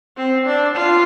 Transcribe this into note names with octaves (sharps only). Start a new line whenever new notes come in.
C4
D4
F4